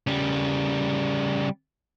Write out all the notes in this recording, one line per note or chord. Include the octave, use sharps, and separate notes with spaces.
C#3 G3